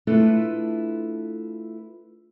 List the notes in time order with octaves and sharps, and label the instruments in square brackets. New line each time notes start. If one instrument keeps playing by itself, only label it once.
[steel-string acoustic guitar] A3 D4 E4 F4 A4 B4